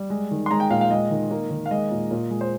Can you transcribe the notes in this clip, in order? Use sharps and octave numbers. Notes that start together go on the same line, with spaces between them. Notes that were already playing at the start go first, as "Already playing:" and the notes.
Already playing: G3
G#3
D#3
C6
G#3 A#5
G5
A#2 F5
F5
G#3 D#5
D#3
A#3
D#3
F5
G#3 D#5
A#2
A#2
G#3
C5